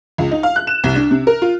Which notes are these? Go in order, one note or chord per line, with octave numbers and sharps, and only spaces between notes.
C#2
D#4
F5
F#6
E7
C2
D4
C3
A#4
F4